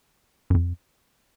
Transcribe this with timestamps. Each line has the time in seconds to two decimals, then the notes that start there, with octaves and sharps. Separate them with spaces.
0.50 F#2
0.55 F2